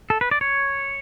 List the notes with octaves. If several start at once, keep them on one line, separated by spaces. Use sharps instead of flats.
A4
B4
D5
C#5